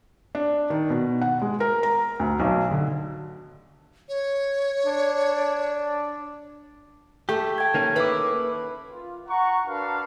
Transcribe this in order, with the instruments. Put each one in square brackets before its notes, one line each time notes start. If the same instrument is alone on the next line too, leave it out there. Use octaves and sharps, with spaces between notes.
[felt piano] D4
D#3
B2
F#5
G#3
A#4
A#5
D2
B1
D3
[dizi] C#5
[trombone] D4
[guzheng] A3 [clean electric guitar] G4
[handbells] G5 G#6
[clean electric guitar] D#3 A#3 C#4
[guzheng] E4 B5 [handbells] B4 D6
[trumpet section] F4
F#5 A#5 C#6
D4 F#4 A#4 B4 F5 A5